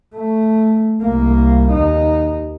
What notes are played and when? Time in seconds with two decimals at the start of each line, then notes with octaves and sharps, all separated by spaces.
0.16 A3
1.02 C2 A#3
1.72 D#2 D#4